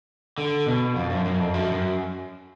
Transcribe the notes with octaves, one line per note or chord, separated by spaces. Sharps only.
D3
B2
F2
F#2
F#2
F2
F#2
F#2